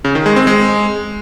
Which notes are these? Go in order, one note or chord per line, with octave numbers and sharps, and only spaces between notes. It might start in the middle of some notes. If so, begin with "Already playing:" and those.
C#3
D#3
G#3
C4
G#3